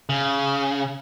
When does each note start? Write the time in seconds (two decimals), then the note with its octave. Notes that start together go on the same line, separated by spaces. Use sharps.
0.09 C#3